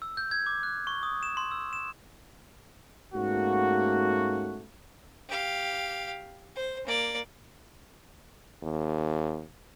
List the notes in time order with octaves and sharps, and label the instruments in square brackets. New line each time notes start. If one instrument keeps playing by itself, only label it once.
[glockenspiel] E6
G6
G#6
D6
F#6
C#6
D#6
E7
C6
E6
E7
[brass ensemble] G#2 A3 A#3 C#4 F#4
[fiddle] G4 F5
C5
A#3 D5
[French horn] D#2